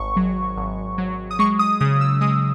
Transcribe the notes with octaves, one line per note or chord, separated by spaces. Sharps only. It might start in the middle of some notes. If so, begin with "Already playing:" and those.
Already playing: G#1 C#6
F#3
G#1
F#3
D#6
G#3 C#6
D#6
C#3 D#6
E6
G#3 D#6